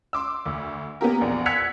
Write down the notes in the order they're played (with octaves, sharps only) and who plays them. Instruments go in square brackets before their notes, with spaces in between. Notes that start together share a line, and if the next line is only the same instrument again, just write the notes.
[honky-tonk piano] C6 D6 E6
D2
A#3 B3 C#4 G4 A#4
A#1 E2
E6 F#6 G#6 B6 C#7 F7